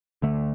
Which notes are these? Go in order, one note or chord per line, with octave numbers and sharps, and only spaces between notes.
D2 D3 A3